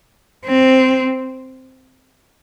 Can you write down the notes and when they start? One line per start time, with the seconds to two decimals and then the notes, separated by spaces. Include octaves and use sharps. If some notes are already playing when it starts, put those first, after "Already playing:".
0.46 C4